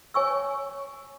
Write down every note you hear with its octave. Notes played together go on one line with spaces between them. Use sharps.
C#5 G#5 C#6 E6